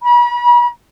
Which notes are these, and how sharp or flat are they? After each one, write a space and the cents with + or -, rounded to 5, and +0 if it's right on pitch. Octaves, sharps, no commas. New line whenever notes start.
B5 -40